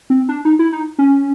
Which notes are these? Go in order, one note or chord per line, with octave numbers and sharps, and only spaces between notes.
C4
D4
D#4
E4
D#4
C#4